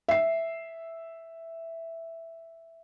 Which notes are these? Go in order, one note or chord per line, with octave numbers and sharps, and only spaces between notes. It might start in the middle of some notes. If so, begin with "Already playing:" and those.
E5 C7